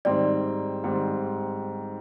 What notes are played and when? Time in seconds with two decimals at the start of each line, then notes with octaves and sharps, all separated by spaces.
0.05 G#2 D#3 G3 C4 D5
0.84 G#2 D#3 G3 C4